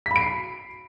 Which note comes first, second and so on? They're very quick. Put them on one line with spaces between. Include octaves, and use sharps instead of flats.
B6 B5 D7 C7